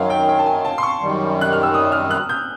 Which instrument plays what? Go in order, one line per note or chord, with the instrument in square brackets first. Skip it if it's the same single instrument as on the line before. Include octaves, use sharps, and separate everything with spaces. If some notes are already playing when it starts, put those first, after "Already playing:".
Already playing: [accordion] F#2 D#3 F#3 [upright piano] F5
[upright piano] G5
G5
A5
G#5
A5
C6
C#6
[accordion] F#2 D#3 G3
[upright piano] F#6
F6
E6
D#6
F6
F#6
G6